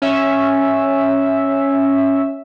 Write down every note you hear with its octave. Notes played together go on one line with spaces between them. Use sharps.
C#4 E5